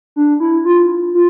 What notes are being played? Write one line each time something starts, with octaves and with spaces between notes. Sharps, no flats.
D4
E4
F4
F4